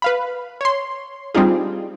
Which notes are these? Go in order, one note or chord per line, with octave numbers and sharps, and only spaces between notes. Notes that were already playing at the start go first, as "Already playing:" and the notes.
B4 F5 B5
C#5 C6
G3 C4 D4 D#4 F4 G#4